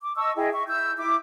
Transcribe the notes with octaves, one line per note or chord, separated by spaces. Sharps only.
D6
D#5 A5 C#6 E6
E4 G#4 D#5 G5
E5 C#6
E4 E6 G6
E4 D6